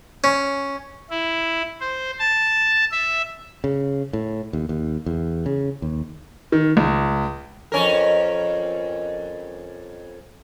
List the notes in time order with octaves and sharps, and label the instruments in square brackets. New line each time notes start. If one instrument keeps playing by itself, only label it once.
[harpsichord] C#4
[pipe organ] E4
C5
A5
E5
[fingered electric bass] C#3
A2
D#2
D#2
E2
C#3
D#2
[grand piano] D#3
C#2
[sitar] F2 C#4 A#4